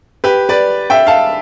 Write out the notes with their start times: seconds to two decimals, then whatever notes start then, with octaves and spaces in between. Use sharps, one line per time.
0.24 G4 B4
0.49 B4 D5
0.90 E5 G5
1.07 F5 A5